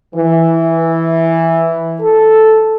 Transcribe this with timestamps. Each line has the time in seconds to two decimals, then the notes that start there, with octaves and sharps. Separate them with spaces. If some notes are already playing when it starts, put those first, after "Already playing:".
0.15 E3
2.01 A4